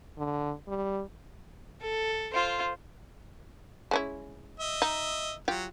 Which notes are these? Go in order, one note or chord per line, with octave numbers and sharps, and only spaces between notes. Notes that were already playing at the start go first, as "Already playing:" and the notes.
D3
G3
A4
F4 C5
G#3 C#4 E4
D#5 E5
D#4
F#3 F4 G4